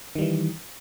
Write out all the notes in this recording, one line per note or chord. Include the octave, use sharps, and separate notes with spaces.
D#3 E3 G3